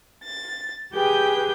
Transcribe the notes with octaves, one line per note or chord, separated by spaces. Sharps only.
A6
G4 G#4 B4 G5 G6